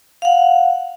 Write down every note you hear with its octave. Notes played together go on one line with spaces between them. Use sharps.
F5 F#5